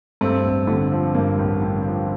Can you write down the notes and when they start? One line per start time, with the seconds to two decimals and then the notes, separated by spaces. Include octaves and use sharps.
0.21 G2 A3 C4
0.44 A1
0.67 D3 A3
0.92 F3
1.14 G2 A#3
1.38 A1
1.63 D3
1.86 F3